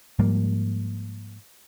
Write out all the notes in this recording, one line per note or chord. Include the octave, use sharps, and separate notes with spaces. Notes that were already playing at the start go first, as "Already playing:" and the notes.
G#2 F3 G3 A#3